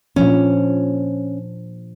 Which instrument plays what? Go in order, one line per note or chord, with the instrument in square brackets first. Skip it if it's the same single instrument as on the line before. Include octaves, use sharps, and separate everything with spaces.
[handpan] A#2 F3 D4 [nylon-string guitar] C#4